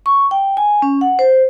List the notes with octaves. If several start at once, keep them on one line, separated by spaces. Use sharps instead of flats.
C#6
G5
G#5
C#4
F#5
C5